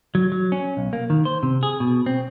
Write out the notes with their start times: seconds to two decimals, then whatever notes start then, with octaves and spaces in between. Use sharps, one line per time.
0.15 F#3
0.32 F#3
0.52 C#4
0.77 B1
0.93 A#3
1.10 D#3
1.25 C5
1.43 C3
1.63 G#4
1.80 B2
2.06 C4